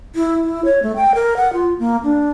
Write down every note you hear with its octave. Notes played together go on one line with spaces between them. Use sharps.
E4
E4
C#5
A3
G5
A#4
F#5
F4
A#3
D4